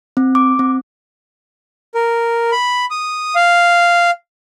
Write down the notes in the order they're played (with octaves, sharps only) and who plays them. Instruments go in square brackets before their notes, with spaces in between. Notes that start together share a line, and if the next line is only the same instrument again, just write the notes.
[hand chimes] C4
D6
C4
[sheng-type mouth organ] A#4
B5
D#6
F5